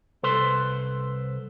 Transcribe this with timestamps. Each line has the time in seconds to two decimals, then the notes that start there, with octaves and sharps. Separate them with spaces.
0.23 C2 A4 B4 C5 C6